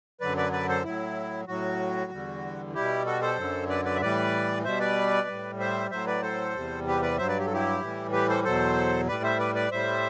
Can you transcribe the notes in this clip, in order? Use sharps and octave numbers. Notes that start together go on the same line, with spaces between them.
F#2 D3 F#3 B4 D5
B4 D5
B4 D5
A4 C5
A2 F#3 E4
A2 F#3 F#4
E2 D3 G3
B2 G3 E4 G4
F#4 A4
A4 C5
F#2 D3 F#3
B4 D5
B4 D5
E5
A2 E3 G3 B4 D5
B2 G3 C5 E5
B4 D5
A2 G3
C5 E5
A2 F#3 C5 E5
B4 D5
A4 C5
E2 C3 G3
G4 B4
B4 D5
G2 F#3 C5 E5
B4 D5
G4
A4
E4 G4
A2 E3 G3
G4 B4
A4 C5
E2 B2 F#3 A4 C5
A2 G3 B4 D5
C5 E5
B4 D5
B4 D5
A2 G3 C5 E5